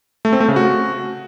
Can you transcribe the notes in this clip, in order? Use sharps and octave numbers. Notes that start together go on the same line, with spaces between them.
A3
C4
A3
C#3
F#4